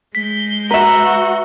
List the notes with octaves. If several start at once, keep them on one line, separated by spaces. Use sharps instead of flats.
G#3 G6 B6
F#4 B4 E5 A#5 C#6